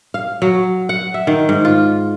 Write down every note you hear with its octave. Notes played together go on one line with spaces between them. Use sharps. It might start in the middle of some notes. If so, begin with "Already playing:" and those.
F5
F#3
F#5
E5
D#3
G#2
F4